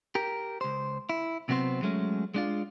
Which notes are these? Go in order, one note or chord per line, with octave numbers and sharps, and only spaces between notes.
G4 A#4
C#2 C5
E4
C3 F#3 B3 C4 C5
F#3 G#3 A3 C#4
G#3 D4 F4